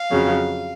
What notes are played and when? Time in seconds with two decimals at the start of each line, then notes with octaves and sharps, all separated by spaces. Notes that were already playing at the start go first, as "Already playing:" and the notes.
Already playing: F5
0.11 F2 C#3 F#3